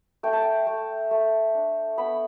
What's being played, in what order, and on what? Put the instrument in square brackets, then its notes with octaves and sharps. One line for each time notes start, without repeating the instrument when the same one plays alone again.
[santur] A3 G5
A5
G5
A3
A3
D4
B3 B5